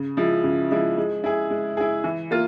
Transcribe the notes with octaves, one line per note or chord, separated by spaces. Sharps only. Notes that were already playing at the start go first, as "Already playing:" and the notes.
Already playing: C#3
F3 G#3 E4
C#3
F3 G#3 E4
G#3
E4 G#4
G#3
E4 G#4
E3
A#3 F4